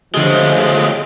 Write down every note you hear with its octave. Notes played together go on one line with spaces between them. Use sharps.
A2 D3 F3 G#3 G4